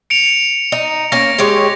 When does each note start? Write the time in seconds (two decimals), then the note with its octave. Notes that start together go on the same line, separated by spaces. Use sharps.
0.10 C#7 D7 F7
0.72 D#4
1.12 A#3 C#4 A#6
1.38 G#3 G4 C#5